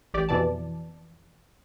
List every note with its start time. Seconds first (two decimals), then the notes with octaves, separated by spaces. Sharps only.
0.14 A1 G4 D5
0.29 F2 B2 E3 D5 A5